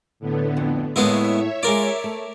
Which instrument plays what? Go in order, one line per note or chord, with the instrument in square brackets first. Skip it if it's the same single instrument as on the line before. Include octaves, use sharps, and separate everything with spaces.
[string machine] A2 D3 B3
[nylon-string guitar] F2
[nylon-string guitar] A2 A#3 [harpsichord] G#3 B3 E4 [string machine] C#5 E5
[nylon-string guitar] G#3 F4 [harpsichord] A#4 D5
[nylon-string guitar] A3